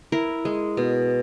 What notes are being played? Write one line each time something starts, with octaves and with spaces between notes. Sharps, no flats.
E4 A#4
G#3
B2